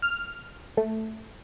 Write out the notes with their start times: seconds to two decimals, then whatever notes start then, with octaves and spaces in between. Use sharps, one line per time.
0.02 F6
0.77 A3